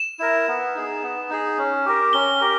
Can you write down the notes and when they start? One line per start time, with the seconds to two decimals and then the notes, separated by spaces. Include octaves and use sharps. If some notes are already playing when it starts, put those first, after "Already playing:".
Already playing: E7
0.19 E4 A#4
0.48 B3
0.75 D#4 G#4
1.03 B3
1.30 D#4 G#4
1.58 C#4
1.86 G4 A#4
2.13 C#4 G7
2.41 G4 A#4